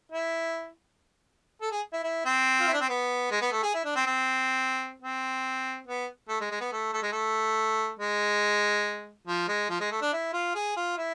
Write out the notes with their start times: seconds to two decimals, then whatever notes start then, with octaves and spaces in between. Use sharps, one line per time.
0.12 E4
1.62 A4
1.72 G#4
1.93 E4
2.04 E4
2.26 C4
2.60 F4
2.67 E4
2.74 D4
2.81 C4
2.89 B3
3.31 G#3
3.42 B3
3.52 A3
3.63 G#4
3.75 E4
3.85 D4
3.96 C4
4.06 C4
5.02 C4
5.87 B3
6.29 A3
6.41 G#3
6.51 G#3
6.61 B3
6.73 A3
6.94 A3
7.03 G#3
7.12 A3
7.99 G#3
9.28 F3
9.48 G#3
9.70 F3
9.80 G#3
9.91 A3
10.02 D4
10.13 E4
10.33 F4
10.55 G#4
10.77 F4
10.98 E4